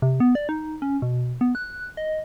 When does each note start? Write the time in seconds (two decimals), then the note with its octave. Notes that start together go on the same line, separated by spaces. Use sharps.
0.02 C3
0.20 B3
0.35 D5
0.49 D#4
0.82 C#4
1.02 B2
1.41 B3
1.55 F#6
1.97 D#5